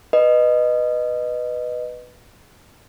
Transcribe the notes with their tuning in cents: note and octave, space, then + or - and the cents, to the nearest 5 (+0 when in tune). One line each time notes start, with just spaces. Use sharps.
B4 +0 D#5 -15